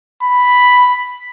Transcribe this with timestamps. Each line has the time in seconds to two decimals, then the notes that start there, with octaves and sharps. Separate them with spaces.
0.23 B5